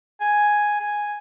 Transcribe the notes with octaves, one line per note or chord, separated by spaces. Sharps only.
G#5
G#5